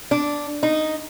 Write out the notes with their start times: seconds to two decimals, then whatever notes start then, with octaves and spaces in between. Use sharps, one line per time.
0.11 D4
0.63 D#4